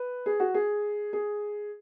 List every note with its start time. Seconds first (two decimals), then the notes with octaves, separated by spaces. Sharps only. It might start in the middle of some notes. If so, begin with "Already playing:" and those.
Already playing: B4
0.26 G#4
0.40 F#4
0.54 G#4
1.13 G#4